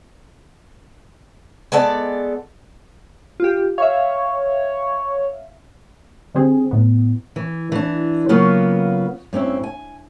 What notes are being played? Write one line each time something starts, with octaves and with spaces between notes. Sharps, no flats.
G#3 B3 A4 D5
F4 G4
C#5 E5 F5
D3 G3 C4 G#4
A2 B3
E3
E3 D4
C#3 F#3 A#3 B3 F4 B4
G2 C4 C#4 E4
G#5